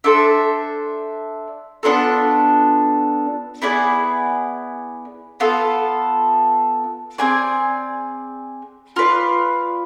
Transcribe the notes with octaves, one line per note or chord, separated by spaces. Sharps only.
D4 A4 C5 E5
B3 D4 F4 A4
B3 E4 G#4 D5
B3 F4 A4
C4 G#4 D5 G#5
F4 B4 D5